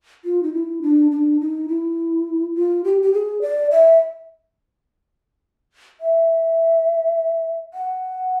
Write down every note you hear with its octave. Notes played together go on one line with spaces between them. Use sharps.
F4
D#4
E4
D4
D4
D#4
E4
F4
G4
G4
G#4
D5
E5
E5
F#5